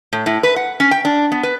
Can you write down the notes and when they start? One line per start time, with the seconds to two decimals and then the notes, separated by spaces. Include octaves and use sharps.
0.13 A2
0.26 A2
0.43 B4
0.56 F#5
0.80 C#4
0.91 G5
1.05 D4
1.32 B3
1.43 B4